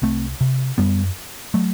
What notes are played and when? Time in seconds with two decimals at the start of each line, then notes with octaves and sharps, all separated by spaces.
0.02 C2 A3 C4
0.41 C3
0.78 F#2 G3 B3
1.54 F#3 A3